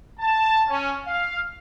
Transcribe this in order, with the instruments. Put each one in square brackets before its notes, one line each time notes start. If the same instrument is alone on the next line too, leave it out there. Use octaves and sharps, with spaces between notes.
[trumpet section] A5
C#4
F5